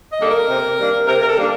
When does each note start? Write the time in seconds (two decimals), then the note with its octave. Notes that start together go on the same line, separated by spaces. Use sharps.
0.11 D#5
0.20 D#3 G3 A#3 D4 A4
0.30 A#4
0.50 C3
0.78 D#3 G3 A#3 D4
1.07 C3 A#4
1.22 A#4
1.27 A4
1.36 D#3 G3 A#3 D4